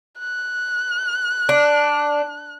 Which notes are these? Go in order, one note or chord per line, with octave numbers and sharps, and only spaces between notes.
F#6
D4